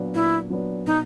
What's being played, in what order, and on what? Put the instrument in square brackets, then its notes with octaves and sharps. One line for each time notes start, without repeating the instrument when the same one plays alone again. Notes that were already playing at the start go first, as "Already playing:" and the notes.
Already playing: [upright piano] A#2 F#3 B3 D4
[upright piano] A#2 [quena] E4
[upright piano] F#3 B3 D4
[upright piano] B2 [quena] D#4